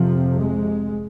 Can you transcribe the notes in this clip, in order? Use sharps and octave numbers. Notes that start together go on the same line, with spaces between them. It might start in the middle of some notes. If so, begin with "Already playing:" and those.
Already playing: F2 C3 F3
G#3